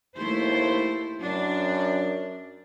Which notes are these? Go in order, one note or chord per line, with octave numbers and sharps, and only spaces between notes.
D#2 A3 E4 C5
F#2 D4